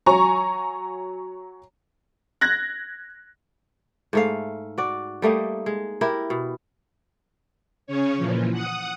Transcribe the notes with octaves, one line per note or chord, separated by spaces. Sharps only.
F#3 C#5 G#5 A#5 C#6
F#6 G#6 A#6
G#2 A3 F5
F#4 D5
G3 A3 A#3 D#4
G#3
E4 G4 A#4
B2
C#3 C#4 C#5
A#2 E3 F3
F#5 D#6